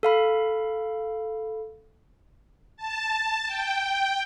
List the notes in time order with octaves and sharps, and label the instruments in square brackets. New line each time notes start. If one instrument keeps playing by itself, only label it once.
[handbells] A4 F5 B5
[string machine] A5
G5